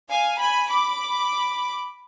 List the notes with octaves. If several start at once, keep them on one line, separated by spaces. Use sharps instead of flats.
F5 G#5
G#5 B5
B5 D6